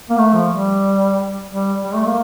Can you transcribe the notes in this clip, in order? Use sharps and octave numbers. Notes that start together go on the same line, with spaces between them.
A#3
A3
F3
G3
G3
G3
A3
A#3